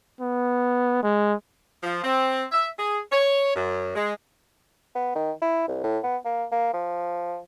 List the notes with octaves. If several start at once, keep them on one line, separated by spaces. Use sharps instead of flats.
B3
G#3
F3
C4
E5
G#4
C#5
F#2
G#3
B3
D#3
E4
C2
A2
B3
A#3
A#3
F3